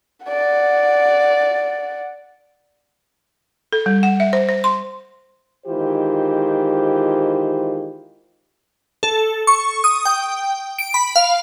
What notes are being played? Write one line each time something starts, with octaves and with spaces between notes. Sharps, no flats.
D5 F#5
A4
G3
F#5
E5
C5
C5
C6
D#3 E3 G#3 F4 G4 C5
A4
C#6
D#6
G5
D7
B5
F5